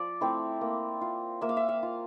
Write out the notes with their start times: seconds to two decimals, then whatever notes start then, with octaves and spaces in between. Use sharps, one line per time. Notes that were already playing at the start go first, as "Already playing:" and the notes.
Already playing: F3 D5
0.21 A3 C4 E4
0.61 A#3
1.01 F4
1.41 A#3 E5
1.49 F5
1.57 E5
1.69 F5
1.83 F4